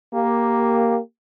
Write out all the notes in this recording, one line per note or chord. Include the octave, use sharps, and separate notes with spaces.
A#3 G4